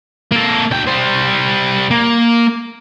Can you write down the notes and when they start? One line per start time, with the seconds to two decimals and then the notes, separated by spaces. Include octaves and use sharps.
0.32 A#3 A4
0.71 D2 G5
0.87 G3 C5
1.91 A#3